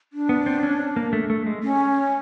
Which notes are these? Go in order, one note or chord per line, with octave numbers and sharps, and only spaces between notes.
D4
B3
C4
C#4
A#3
A3
A3
G#3
C#4